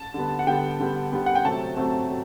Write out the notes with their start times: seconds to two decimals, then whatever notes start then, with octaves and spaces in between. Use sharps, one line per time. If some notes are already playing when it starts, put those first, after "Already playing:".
Already playing: A5
0.14 D3 G3 B3
0.39 F#5
0.47 D3 G3 B3 G5
0.80 D3 G3 B3
1.12 D3 G3 B3
1.26 F#5
1.35 G5
1.44 C3 F#3 A3 C4 A5
1.77 C3 F#3 A3 C4
2.09 F#3